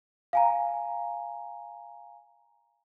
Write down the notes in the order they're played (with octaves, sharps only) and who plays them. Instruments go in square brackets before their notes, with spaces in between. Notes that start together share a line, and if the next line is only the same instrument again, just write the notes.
[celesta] F5 G#5 A#5